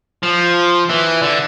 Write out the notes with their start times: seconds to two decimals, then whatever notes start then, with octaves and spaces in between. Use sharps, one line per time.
0.23 F3
0.90 E3
1.22 D3